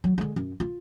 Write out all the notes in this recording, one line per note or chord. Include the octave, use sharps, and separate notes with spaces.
F#3
D3 G#3
F#2
F4